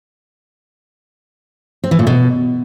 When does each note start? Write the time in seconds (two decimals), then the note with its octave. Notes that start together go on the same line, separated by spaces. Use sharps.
1.84 C4
1.91 E3
1.99 A#2
2.07 B2